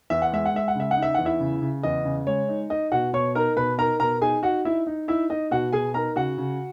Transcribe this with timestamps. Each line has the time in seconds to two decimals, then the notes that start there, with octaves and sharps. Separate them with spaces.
0.10 E2 E5
0.22 F#5
0.32 G#3 E5
0.45 F#5
0.54 G#3 E5
0.68 F#5
0.75 C#3 E5
0.91 F#5
0.97 D#4
1.02 E5
1.14 E2 F#5
1.25 E4 E5
1.40 C#3
1.62 C#3
1.83 E2 D#5
2.05 C#3
2.27 G#3 C#5
2.49 D#4
2.70 D#4 D#5
2.92 B2 F#4 F#5
3.13 B2 C#5 C#6
3.35 D#4 A#4 A#5
3.56 B2 B4 B5
3.78 D#4 A#4 A#5
4.00 B2 A#4 A#5
4.21 D#4 G#4 G#5
4.43 D#4 F#4 F#5
4.65 D#4 E4 E5
4.87 D#4
5.08 D#4 E4 E5
5.30 D#4 D#5
5.51 B2 F#4 F#5
5.73 B2 G#4 G#5
5.94 D#4 A#4 A#5
6.16 C#3 F#4 F#5
6.38 C#3